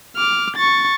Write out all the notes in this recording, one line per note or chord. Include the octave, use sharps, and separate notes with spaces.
D6 F6
C#6 A6